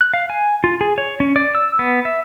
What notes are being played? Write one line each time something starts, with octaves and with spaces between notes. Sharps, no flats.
F#6
F5
G#5
F4
G#4
C#5
C#4
D5
E6
B3
E5